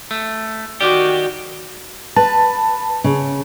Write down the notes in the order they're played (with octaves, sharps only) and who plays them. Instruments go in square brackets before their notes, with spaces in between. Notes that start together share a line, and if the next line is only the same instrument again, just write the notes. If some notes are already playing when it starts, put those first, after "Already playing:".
[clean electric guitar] A3
[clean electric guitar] D#3 G4 [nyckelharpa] F#4 [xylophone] D5 D6
[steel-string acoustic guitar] B4 [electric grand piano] A5
[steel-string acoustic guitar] C#3